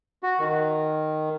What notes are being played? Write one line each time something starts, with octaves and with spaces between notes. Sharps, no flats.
F#4
D#3